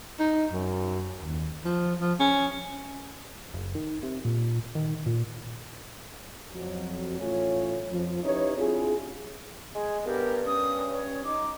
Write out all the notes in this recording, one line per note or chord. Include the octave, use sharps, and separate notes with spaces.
D#4
F#2
D#2
F3
F3
C#4
F#1
D#3
C3
A#2
D#3
A#2
F2 F#3
A1 A3 C#4 F4 C#5
F2 F3
C#4 D#4 E4 G4 B4 C#5
C4 D4 E4 F4 G4 G#4
G#3 G#4
G2 B3 G4 A#4
C#4 D#6
C#5
D#4 D6